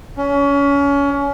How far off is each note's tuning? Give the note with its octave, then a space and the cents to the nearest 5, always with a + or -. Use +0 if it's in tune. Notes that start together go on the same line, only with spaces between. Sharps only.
C#4 +25